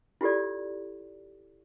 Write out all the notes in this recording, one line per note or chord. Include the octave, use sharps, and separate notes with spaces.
E4 F4 G4 A4 D5